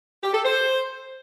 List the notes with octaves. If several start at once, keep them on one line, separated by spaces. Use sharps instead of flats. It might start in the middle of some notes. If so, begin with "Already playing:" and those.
G4
A4
C5